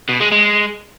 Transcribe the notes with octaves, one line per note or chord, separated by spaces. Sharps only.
B2
G#3
G#3